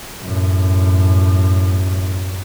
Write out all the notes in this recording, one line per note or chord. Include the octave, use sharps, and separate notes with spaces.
F#2 A2